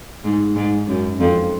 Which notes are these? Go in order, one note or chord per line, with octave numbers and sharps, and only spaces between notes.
G#2
G#2
F#2
F2